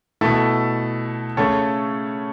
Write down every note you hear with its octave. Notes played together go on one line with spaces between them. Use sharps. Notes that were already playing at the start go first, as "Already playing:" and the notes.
B2 A3 E4 A4
C#3 A3 A4 C#5